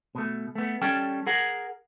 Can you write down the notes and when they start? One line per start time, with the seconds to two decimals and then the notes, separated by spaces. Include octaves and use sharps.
0.15 B2 A3
0.55 A3 B3
0.82 G3 C#4 A4 G5
1.27 G#4 A#4 F#5